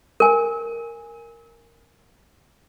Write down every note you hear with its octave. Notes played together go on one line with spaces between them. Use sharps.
A#4 G#5